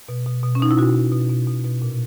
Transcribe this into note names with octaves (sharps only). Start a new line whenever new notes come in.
B2
B2
B2
C#4
B2 D#4
E4
B2 F#4
B2
B2
B2
B2
B2
A#2